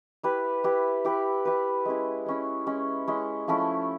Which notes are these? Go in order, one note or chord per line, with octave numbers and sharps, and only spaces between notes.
E4 G4 B4
E4 G4 B4
E4 G4 B4
E4 G4 B4
G#3 C#4 E4
G#3 C#4 E4
G#3 C#4 E4
G#3 C#4 E4
F3 A3 C#4 E4